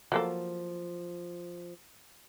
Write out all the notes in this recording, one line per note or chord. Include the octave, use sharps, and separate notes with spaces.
F3 F#3 A#3 A4